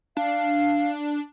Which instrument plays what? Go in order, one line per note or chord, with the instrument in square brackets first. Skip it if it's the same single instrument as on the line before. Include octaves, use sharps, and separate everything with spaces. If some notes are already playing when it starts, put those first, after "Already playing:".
[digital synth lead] D4 [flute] F5